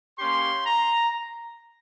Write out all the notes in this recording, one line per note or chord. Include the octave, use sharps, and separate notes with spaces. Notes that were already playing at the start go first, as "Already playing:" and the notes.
A#3 C#4 G4 C6
A#5